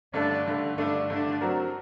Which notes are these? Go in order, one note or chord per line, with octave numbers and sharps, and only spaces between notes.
G2 D3 A3 D4
G2 D3 A3
G2 D3 A3 D4
G2 D3 A3 D4
F#3 C4 F#4 A#4